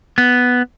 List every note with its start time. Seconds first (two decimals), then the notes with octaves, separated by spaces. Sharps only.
0.18 B3